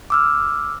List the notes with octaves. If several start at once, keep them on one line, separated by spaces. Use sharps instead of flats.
D6 E6 F6